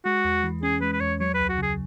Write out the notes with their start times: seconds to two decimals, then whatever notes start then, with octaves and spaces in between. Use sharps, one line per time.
0.05 G#3 F#4
0.24 E2
0.44 E3
0.63 C#4 G#4
0.81 G#3 B4
0.93 B4
1.00 E2 C#5
1.20 F#3 C#5
1.34 B4
1.40 C#2
1.49 F#4
1.58 C#3 G#4